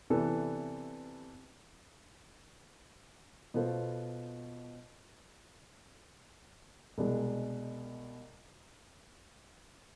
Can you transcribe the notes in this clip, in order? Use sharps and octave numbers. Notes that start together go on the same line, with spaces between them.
C3 E3 B3 D4 A4
B2 B3 F4 A4 C5
C2 B2 G#3 D4